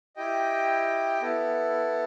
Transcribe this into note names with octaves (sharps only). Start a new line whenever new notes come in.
E4 G4 D#5 G5
B3 E4 A4